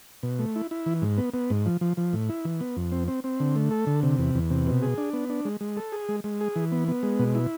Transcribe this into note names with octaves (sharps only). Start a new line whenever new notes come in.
B2
A3
E4
E4
E3
G#2
B3
B3
G#2
F3
F3
F3
A2
E4
E3
B3
F2
C4
C4
C4
D3
A3
A4
D3
C3
E2
E2
C3
B2
G#4
D4
B3
D4
G#3
G#3
A4
G#4
G#3
G#3
G#4
E3
B3
B3
G#3
B2
E4